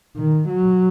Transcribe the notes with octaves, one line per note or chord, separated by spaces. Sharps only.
D#3
F#3